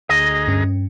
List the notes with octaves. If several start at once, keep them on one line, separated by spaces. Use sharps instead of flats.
D2 G#4 D#5 A#5
G2 C#4